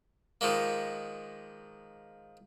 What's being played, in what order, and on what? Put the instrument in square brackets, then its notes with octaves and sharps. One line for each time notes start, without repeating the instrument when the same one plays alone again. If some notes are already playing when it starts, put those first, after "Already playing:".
[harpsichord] D#3 F3 G#3 A#3